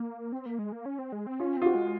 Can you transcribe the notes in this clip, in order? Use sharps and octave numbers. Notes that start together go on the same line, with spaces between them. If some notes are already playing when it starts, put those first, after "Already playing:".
Already playing: A#3
C4
A#3
G#3
A#3
C#4
C4
G#3
C4
C#4 F4
C4 F4
F#4
G#3